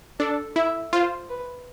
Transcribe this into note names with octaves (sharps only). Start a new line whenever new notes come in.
D4 A4
E4 E5
F4 C5
B4